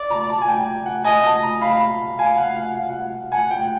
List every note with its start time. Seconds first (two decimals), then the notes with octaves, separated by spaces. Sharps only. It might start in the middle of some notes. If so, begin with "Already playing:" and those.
Already playing: D5
0.10 A#5
0.29 A5
0.41 G#5
0.48 G5
0.86 F#5
1.04 D#5 G#5
1.24 A5
1.43 A#5
1.61 F5 B5
2.18 F5 G#5
2.37 F#5
2.57 F#5
2.75 F5
2.90 F#5
3.32 F#5 G#5
3.51 G5